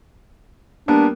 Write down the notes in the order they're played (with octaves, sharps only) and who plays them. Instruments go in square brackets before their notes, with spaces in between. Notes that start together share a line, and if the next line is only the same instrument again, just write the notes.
[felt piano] G3 A#3 B3 [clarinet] D4